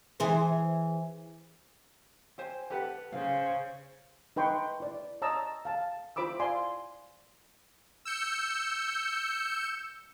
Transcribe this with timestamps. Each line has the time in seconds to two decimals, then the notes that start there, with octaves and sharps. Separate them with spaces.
0.20 E3 G#4 C5
2.38 G4 C5 G#5
2.70 G4 A4 B4 F#5
3.13 C#3 C5 F5
4.36 D#4 B4 G5 C6 C#6
4.80 E4 D5
5.22 C#5 D#5 A5 A#5 D#6 E6
5.65 F5 A5
6.16 E4 F4 C5 B5 D6 E6
6.39 D5 F5 G#5 C6
8.05 E6 G6 C#7